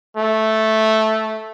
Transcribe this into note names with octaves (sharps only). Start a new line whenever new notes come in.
A3